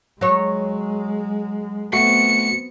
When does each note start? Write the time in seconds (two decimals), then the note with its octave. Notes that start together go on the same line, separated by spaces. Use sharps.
0.21 F#3 G#3 C#5
1.93 A3 B3 C4 F#4 C#7